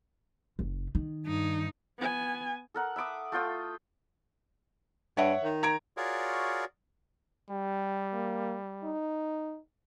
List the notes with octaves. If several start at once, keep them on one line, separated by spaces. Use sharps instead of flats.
F#1
D#3
G2 D#4
B3 G#5
A4 A#4 F#5
E5 B5 D6 D#6
A3 F4 G5 D#6
G2 C#5 E5 F#5
D#3
A#5 G#6 D7
F4 F#4 G#4 A#4 C#5 D5
G3 G4
A#3
D#4